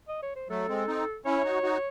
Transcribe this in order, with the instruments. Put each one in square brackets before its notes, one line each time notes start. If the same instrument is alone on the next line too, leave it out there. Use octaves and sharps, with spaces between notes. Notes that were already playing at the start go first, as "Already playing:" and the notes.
[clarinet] D#5
C#5
C5
[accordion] F#3 A3 [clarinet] A4
[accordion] G#3 C4
C4 D#4
[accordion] C#4 E4 [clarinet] C#5
[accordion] D#4 F#4
D#4 F#4